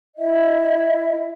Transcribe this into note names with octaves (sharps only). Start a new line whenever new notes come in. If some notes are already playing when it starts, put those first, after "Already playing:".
E4 D#5 E5